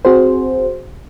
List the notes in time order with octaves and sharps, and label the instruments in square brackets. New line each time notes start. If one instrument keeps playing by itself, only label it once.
[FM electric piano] C4 F#4 G#4 C5